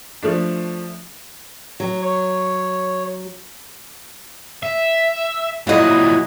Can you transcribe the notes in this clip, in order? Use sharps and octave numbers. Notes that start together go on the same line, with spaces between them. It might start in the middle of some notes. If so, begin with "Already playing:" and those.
F3 A3 D4
F#3
C#5
E5
A#2 F#3 E4 F#4 D#5